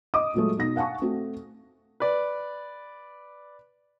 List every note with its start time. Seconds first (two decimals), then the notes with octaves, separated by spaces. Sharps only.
0.14 D#5 D6 D#6
0.34 A#2 F#3 G#3 A3
0.57 B2 D#4 A#6
0.76 F5 F#5 G#5 A5 C#6
1.02 A3 C4 F#4
2.00 B4 D5